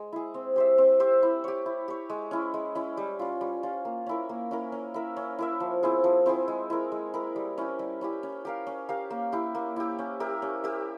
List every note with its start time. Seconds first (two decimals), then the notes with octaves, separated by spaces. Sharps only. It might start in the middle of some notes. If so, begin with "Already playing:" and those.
Already playing: G#3
0.13 E4 G#4
0.34 C4
0.56 G4 C5 E5
0.78 C4
1.00 G4 C5 E5
1.23 E4
1.44 G4 C#5
1.66 E4
1.88 G4 C#5
2.10 G#3
2.31 C#4 E4
2.54 G#3
2.75 C#4 E4
2.97 G3
3.19 C#4 F4
3.41 G3
3.63 C#4 F4
3.85 A#3
4.06 C#4 E4 A#4
4.29 A#3
4.51 C#4 E4 A#4
4.72 C#4
4.94 E4 A#4 E5
5.17 C#4
5.39 E4 A#4 E5
5.60 F3
5.83 C4 E4 G#4
6.04 F3
6.26 C4 E4 G#4
6.48 G#3
6.70 E4 A#4
6.92 G#3
7.14 E4 A#4
7.36 G3
7.58 C#4 E4 G4
7.79 G3
8.01 C#4 E4 G4
8.23 C#4
8.45 G4 A#4 F5
8.67 C#4
8.89 G4 A#4 F5
9.10 A#3
9.32 E4 G4
9.55 A#3
9.76 E4 G4
9.99 C#4
10.20 G4 A#4 E5
10.42 C#4
10.64 G4 A#4 E5